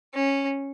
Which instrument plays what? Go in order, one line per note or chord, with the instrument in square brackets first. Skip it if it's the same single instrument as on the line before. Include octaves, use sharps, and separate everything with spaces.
[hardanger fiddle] C#4